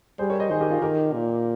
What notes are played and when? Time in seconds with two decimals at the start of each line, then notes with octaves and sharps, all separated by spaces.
0.19 G3 G#4 C5
0.30 A#4 C#5
0.40 C5 D#5
0.50 D#3 G#4 C5
0.61 G4 A#4
0.71 F4 G#4
0.82 D#3 G4 A#4
1.13 A#2